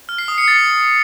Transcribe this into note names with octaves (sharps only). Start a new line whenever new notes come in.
F6
C7
D#6
C#7
A6